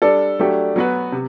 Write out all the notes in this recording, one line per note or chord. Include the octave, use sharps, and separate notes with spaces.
G3 D4 A4 D5
F#3 A3 D4 G4
F#3 B3 F#4 B4
C3